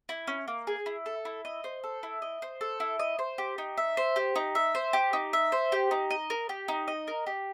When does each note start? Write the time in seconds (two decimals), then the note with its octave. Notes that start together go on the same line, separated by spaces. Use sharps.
0.09 E4
0.27 C#4
0.48 A#3
0.67 G#4
0.86 E4
1.06 A4
1.25 E4
1.45 D#5
1.64 C5
1.84 A4
2.03 E4
2.22 D#5
2.42 C5
2.61 A4
2.80 E4
2.99 D#5
3.19 C5
3.38 G4
3.58 D#4
3.78 E5
3.97 C5
4.16 G4
4.36 D#4
4.55 E5
4.75 C5
4.93 G4
5.13 D#4
5.33 E5
5.52 C5
5.72 G4
5.91 D#4
6.11 D#5
6.30 A#4
6.49 G4
6.68 D#4
6.88 D#5
7.07 A#4
7.27 G4